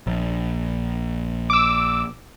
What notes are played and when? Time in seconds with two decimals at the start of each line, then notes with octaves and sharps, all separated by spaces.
0.07 A#1
1.50 D6 E6